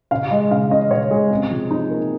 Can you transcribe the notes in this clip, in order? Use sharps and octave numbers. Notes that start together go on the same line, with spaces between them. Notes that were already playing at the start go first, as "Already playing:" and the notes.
C#3 F5
G#3 D#5
C#3 F5
C#4 D#5
C#3 C#5
G#3 G#4
C3
F3
D#4
A#3